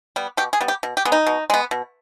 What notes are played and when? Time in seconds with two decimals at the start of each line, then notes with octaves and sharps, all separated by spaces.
0.16 G3 B3
0.37 B2 G4
0.53 G#4
0.61 G3 B3
0.68 G4
0.83 B2
0.97 G4
1.05 G#3 B3
1.12 D#4
1.27 B2
1.50 G#3 B3
1.71 B2